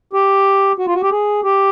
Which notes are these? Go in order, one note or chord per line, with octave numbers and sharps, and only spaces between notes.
G4
F#4
F4
F#4
G4
G#4
G4